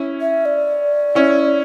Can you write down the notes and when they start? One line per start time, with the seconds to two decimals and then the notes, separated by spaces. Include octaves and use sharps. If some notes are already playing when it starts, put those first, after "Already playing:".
Already playing: C#4 E4
0.21 E5
0.45 D5
1.15 C#4 E4